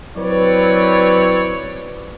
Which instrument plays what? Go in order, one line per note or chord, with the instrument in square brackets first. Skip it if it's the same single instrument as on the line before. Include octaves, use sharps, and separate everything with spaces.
[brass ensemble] F#3 C4 E4 B4 C#5 D5